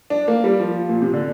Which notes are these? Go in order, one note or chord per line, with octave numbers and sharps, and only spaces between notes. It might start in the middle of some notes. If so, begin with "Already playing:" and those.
D4
A#3
G3
F3
A#2
C3
D3